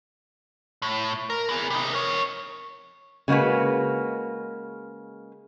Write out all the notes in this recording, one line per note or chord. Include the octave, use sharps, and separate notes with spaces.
A2
A#4
B3 G#4
C3 D#4
A#4 C#5
C#3 G#3 A#3 F#4 B4